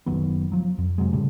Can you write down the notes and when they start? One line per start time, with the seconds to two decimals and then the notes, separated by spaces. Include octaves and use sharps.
0.06 F#1 D#3 F#3 B3
0.52 F3 F#3
0.78 F2
0.98 C3 F#3 G#3
1.12 A2 C#3 G3 A3